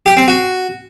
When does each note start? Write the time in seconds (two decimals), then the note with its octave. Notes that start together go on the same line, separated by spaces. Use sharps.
0.06 G4
0.17 C4
0.28 F#4